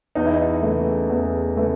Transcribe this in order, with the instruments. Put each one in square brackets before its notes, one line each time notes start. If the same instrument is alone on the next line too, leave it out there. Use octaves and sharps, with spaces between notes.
[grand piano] E2 D#4
E4
D#4
C#3 E3 A3
E2
C#3 E3 A3